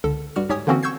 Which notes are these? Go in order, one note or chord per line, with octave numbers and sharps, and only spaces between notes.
C#2 D3 A4
G2 G3 F#4 F6
G#2 G4 C#5 G#5 D#6
D3 E3 A#3 C4 C#4 F#4
C#6 E6 G6 G#6 C7